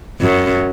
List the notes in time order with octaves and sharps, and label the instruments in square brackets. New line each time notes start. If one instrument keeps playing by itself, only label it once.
[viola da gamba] F#2